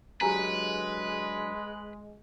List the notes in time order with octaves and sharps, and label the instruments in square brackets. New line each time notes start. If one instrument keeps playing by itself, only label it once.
[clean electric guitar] D3 E3 F#3 [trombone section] G#3 [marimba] G4 G#5 A#5 [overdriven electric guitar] B4